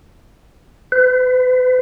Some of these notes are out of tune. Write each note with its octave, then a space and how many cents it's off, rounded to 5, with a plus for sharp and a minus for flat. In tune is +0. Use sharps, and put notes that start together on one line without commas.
B4 +40